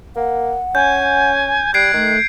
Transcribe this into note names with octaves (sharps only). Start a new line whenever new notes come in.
A#3 F#5
C#4 G#5 G6
G3 F#6 G#6 C7 D7
D#3 A3